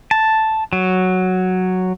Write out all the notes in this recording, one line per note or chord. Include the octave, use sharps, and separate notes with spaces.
A5
F#3